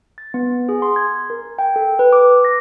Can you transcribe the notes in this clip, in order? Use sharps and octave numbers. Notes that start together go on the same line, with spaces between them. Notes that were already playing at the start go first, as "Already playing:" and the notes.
A6
B3
G#4
C6
G#6
A#4
G5
A4
B4
D6
A#6